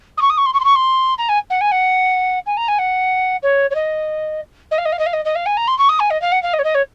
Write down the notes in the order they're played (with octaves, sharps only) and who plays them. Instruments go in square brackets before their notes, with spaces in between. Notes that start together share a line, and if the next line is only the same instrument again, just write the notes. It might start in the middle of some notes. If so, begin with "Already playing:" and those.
[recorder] D#6
C#6
D#6
C#6
C6
C#6
C6
C#6
C6
A#5
G#5
F#5
G#5
F#5
G#5
A#5
G#5
F#5
C#5
C#5
D#5
D#5
F5
D#5
F5
D#5
F5
D#5
D#5
F5
G#5
A#5
C6
C#6
D#6
G#5
D#5
F5
F#5
F5
D#5
C#5
D#5
C#5